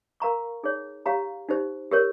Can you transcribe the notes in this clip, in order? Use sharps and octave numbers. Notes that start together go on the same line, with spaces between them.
A#4 F5 A#5 C#6
D#4 G#4 C#5
G4 C#5 F5 A#5
D#4 G4 C5
G4 A#4 C#5